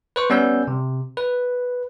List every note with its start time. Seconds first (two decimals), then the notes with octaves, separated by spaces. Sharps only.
0.16 B4 C5 C#6
0.30 G3 B3 C#4 E6 G6
0.67 C3
1.17 B4